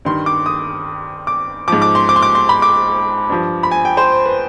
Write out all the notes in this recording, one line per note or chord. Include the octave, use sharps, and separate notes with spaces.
G2 D#3 C6
D6
D#6
D6
G#2 F3 D6
D6
C6
D6
C6
D6
C6
B5
D6
G2 F3
B5
G#5
G5
C5
B4